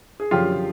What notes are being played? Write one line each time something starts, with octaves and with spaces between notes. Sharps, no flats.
G#4
F#2 D3 F3 F4 G4